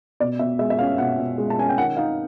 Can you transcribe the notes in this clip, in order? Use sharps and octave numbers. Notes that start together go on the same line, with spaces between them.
B2 D5
B2 E5
G#3 E5
E5
C#4 F5
B2 F#5
B2
G#3
A5
C#4 G#5
G5
D#3 F#5
D#4 F5